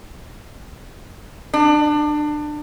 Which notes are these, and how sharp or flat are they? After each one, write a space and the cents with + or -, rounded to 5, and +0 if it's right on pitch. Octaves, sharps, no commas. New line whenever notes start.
D4 +25